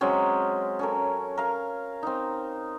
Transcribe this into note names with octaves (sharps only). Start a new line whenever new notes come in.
F#3 G#3 C4 C#4
C#4 A4 A#4
A#4 F5
C4 D#4